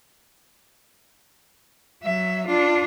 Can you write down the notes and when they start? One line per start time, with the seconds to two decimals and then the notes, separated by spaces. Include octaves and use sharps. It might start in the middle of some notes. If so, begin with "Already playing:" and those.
2.04 F#3 E5
2.47 D4 F4